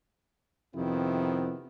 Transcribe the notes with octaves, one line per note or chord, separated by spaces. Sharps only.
F2 C3 D#3 B3 C4 E4